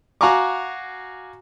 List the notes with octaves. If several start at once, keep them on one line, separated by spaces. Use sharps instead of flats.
F#4 F5 G#5 A#5 C#6 D6